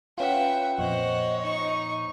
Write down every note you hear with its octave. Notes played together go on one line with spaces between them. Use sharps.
C#4 F4 B4 E5 F#5 G5
F2 A#2 C5 C#5 D#5 F#5
D#4 C#6